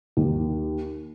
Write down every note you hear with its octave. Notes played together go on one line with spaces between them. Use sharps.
D#2